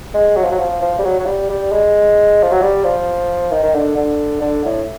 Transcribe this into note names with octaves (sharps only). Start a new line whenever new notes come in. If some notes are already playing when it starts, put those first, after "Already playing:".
G#3
F#3
F3
F#3
F3
F3
G3
F#3
F#3
G3
G3
G#3
F3
F#3
G3
F3
D#3
D#3
D3
D3
D3
A2